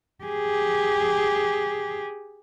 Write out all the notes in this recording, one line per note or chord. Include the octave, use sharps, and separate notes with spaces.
G4 G#4